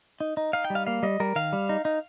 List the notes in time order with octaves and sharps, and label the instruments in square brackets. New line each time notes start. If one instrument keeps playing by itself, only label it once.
[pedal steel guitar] D#4
D#4
D#4 F5
G5
G3
F5
A#3 F5
G3 D#5
G3 A#4
D#3 F5
G3
D#4
D#4